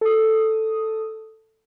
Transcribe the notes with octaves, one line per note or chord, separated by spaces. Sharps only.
A4 D#6